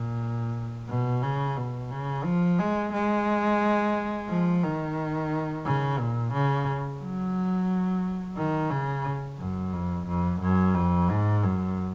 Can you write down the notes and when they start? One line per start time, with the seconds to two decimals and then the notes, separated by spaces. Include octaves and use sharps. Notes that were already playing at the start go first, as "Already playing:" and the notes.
Already playing: A#2
0.89 B2
1.23 C#3
1.57 B2
1.92 C#3
2.25 F3
2.59 G#3
2.93 G#3
4.29 F3
4.63 D#3
5.65 C#3
5.99 A#2
6.33 C#3
7.01 F#3
8.37 D#3
8.70 C#3
9.39 F#2
9.73 F2
10.07 F2
10.41 F#2
10.75 F2
11.09 G#2
11.43 F#2